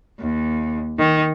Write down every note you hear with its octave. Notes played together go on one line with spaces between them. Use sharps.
D#2
D#3